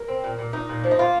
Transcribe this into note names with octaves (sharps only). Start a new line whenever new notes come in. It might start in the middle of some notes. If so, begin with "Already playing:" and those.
Already playing: A#4
C4
A#2
A#2
A#2 D#4
A#2
F3
D#4
A#3 F4